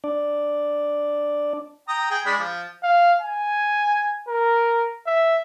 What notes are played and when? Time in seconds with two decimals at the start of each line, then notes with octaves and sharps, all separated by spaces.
0.04 D4 D5
1.88 G5 A#5 D#6
2.10 G#4 G5
2.26 G#3 D4 B5
2.39 F3
2.83 F5
3.22 G#5
4.28 A#4
5.07 E5